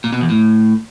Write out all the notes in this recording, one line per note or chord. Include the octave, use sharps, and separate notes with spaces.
A#2
B2
E2
A2